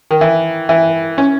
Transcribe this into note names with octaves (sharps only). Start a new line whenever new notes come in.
D#3
E3
E3
C#4